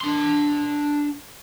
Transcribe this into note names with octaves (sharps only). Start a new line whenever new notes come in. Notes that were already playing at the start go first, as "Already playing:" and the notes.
D4 C6